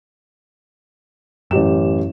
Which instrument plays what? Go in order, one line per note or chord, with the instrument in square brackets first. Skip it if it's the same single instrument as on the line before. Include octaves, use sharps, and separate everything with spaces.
[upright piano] A1 G4 E7 [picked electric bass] F#2